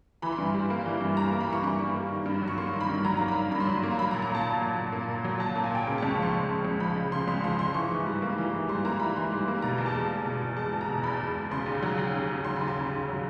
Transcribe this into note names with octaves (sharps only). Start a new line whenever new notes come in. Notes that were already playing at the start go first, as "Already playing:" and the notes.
E3 B5
C6
G2 B5
G3
A#3
E3
G2
G3 A#5
A#5
A#3
B5
E3
C#6
G2 C#6
G3
A#3
D#3
G2
F#3
C#6
A#3 C6
D#3
B5
G2
F#3 A#5
A#3 A#5
B5
D#3
G2 B5
C6
F#3 B5
A#3
A#5
F#3 B5
A#5
A#2
A#5
A#3 A5
A#2
F#3
A#2
A#3
A#2
F#3
A#2 A5
A#3
G#5
A#2 G5
C#3 G5
A5
C#2
C#6
F3 C6
G#3
C#3
C#2
F3 B5
G#3
C#3 C6
C#2 C6
F3 C6
G#3 C6
E3 C#6
G#2
G3
A#3
E3
G#2
G3 C6
A#3 A#5
E3 B5
G#2 C6
G3
A#3
B2 A#5
E2
A5
G#3
E2
B2
E2
G#3 A5
E2
A#5
B2
E2 B5
G#3
E2
C#3 C6
D#2
F#3
D#2
C#3
D#2
F#3 C6
B5
D#2
C6
C#3
D#2
F#3